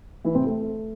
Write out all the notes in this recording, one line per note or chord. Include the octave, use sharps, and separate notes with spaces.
E3 E4
C3 C4
A3